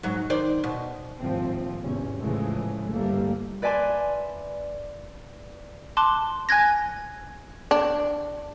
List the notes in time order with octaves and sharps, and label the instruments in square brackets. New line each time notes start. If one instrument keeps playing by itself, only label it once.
[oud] G#2 F#3
D#3 C5 D5
B2
[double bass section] G#1 D#2 A2 F3 C4
G#1 E2 C3 C#4
A2 C#3 E3 F3 G#3 A3
G1 G3 A3 A#3
[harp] B4 D5 E5 G#5 A5 C6
[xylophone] A5 C6 D6 F#6
G#5 F#6 G#6 A#6
[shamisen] D4